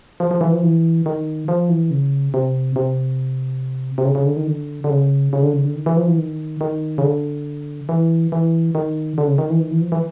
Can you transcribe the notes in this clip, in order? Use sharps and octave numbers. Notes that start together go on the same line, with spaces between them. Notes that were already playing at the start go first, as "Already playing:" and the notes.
F3
F3
E3
F3
E3
D#3
F3
E3
C#3
C3
C3
C3
C#3
C#3
D3
D#3
D3
D3
C#3
C#3
D3
C#3
D3
D#3
E3
F3
E3
D#3
D#3
C#3
D3
E3
E3
D#3
D3
C#3
D#3
E3
D#3
E3
F3
E3